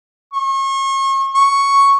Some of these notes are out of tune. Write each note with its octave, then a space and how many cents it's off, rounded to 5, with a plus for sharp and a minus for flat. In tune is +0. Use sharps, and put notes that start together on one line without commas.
C#6 -40
C#6 +0